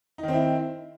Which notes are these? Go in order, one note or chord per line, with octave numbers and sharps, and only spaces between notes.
D#3 C4 D#4 E4